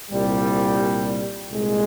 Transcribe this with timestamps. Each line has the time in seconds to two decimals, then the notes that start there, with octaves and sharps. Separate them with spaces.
0.11 C2 A#2 G3
1.51 C2 A#2 G#3